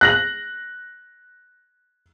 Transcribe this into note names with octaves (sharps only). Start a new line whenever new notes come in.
F#6 A#6 F#7